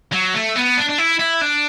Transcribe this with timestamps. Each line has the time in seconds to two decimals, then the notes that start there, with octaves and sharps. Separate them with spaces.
0.12 F#3
0.34 A3
0.56 B3
0.77 D4
0.89 D4
0.98 E4
1.19 E4
1.41 D4